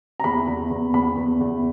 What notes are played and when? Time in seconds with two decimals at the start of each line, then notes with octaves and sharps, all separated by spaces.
0.20 A#5
0.24 E2 B5
0.47 E2
0.71 E2
0.94 E2 B5
1.17 E2
1.41 E2